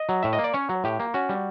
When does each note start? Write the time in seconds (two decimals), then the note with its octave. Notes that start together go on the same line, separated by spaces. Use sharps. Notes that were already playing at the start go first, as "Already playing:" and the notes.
Already playing: D#5
0.09 F#3
0.23 A2 E5
0.33 D#5
0.38 A#3
0.44 D5
0.54 C#4 C#5
0.69 F#3
0.84 A2 G4
1.00 A#3
1.14 C#4 F#4
1.29 G3